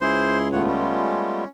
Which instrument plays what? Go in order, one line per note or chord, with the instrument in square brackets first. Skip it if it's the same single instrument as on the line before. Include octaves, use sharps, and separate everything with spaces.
[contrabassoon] C#2 [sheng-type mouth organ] E4 G#4 C6 [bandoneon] C5
[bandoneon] D#2 A2 [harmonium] A3 B3 F4 [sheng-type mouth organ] C#5 F#5
[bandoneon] G3 G#3 [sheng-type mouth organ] C#4